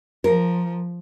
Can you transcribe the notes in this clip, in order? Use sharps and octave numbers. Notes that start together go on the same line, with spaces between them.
F3 A#4